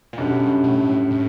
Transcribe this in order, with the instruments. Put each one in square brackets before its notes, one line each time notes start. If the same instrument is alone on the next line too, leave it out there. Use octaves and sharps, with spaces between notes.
[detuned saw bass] A#2
[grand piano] F#2 D3 G3 [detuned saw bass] B2
[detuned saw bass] A2
A2